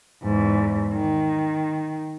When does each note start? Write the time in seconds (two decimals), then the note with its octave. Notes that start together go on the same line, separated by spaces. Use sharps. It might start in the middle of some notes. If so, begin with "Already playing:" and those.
0.24 E2 G#2
0.93 D#3